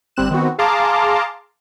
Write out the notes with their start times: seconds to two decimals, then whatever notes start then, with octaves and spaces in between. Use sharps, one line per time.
0.16 G1 G3 C4 F#6 E7
0.31 D#3 B3 C4 F#4
0.58 G#4 F5 A5 A#5 C6 D6